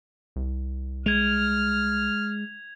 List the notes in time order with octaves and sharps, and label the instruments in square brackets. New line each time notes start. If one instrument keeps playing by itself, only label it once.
[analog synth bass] C2
[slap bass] G#3 [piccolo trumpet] F6 [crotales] G#6 F7